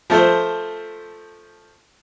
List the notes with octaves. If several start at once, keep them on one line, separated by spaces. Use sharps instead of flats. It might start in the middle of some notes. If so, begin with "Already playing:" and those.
F3 A3 A4 C5